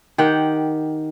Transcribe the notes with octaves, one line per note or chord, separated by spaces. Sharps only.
D#3 G4 F#5 G5